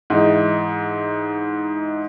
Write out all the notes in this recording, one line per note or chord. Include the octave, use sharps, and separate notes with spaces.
G#2 E3 D#4